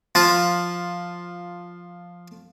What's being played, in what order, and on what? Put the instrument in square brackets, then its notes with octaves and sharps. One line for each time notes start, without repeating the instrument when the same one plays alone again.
[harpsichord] F3 F4